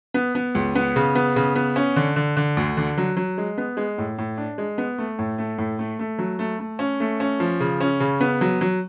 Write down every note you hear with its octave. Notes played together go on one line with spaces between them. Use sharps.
B3
B3
C#2
B3
C#3
B3
C#3
B3
C#4
D3
D3
D3
D2
D3
F#3
F#3
G#3
B3
G#3
A2
A2
D4
G#3
B3
A3
A2
A3
A2
A3
A3
F#3
A3
A3
C#4
A3
C#4
F3
C#3
C#4
C#3
B3
F#3
F#3